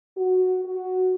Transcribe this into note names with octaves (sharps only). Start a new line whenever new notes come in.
F#4
F#4